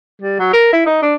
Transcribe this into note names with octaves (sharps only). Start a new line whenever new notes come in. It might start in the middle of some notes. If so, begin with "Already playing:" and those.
G3
F#3
A#4
E4
D#4
D4